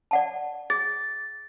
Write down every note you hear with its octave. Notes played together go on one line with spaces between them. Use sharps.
D5 F#5 A5
G#4 A6